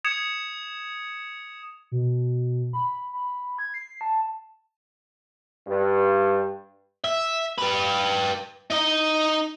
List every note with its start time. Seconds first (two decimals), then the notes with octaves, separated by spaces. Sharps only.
0.04 D#6 G#6 C#7 E7 F7
1.92 B2
2.73 B5
3.13 B5
3.59 G#6
3.74 C7
4.01 A5
5.67 G2
7.04 E5
7.58 G4 B4
8.71 D#4 D#5